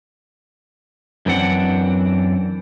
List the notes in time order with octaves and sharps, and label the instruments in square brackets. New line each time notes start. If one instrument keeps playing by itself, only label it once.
[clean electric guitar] F#2 E3 C4 D4 F#5